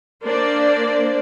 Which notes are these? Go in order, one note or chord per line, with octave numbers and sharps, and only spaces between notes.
A#3 D4 C5 D5